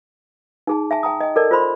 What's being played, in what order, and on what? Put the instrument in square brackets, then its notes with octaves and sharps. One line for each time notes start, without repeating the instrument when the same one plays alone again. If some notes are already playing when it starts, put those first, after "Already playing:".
[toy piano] D#4 G#4 A5
E5 G#5 A5
G5 A5 A#5 D#6
D#5 G5
A4 A#4 D5 D#5 A5
F4 C5 B5 C6